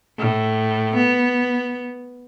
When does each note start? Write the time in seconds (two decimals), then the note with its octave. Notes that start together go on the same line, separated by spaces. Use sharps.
0.18 A2
0.96 B3